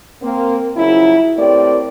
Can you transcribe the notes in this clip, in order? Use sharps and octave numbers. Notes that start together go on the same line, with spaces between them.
A#3 C4
C#3 F3 F#3 E4
A2 A#3 C4 G4 D5